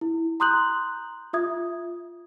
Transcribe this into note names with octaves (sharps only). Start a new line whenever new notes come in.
E4
A#5 C6 D#6 F#6 G6 F#7
F4 E5 D#6 G#6